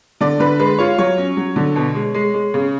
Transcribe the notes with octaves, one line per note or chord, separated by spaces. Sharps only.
D3 D5
D3 B4
G#3 B4
F4 C#5
F#3 C#5
C#4
F#3
D3
B2
G#3
G#3
G#3
C#3